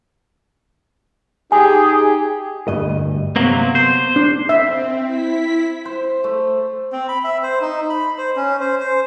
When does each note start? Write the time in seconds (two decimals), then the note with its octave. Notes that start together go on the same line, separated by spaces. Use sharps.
1.52 D#4 G4 G#4 G#5
2.68 D2 G2 D#5
3.36 C3 F#3 A#3 B3
3.75 C5
4.16 D4
4.49 C4 E5
5.02 E4 B6
5.85 C5
6.24 A3
6.92 C4
7.09 B5
7.24 E5
7.43 C5
7.61 D#4
7.90 B5
8.18 C5
8.36 C#4
8.61 C5
8.80 C5